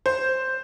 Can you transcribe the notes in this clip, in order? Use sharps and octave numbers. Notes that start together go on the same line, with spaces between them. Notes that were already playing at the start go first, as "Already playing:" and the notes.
C5